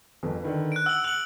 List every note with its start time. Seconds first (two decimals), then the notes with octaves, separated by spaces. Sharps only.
0.23 G1 F2
0.42 D3 D#3 B4
0.72 F#6 D7
0.86 F#5 E6 F#7
1.04 F#6 C#7 F7 F#7